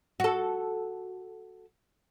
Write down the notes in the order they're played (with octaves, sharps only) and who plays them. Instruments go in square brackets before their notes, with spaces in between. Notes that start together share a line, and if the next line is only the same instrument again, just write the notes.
[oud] F#4 A4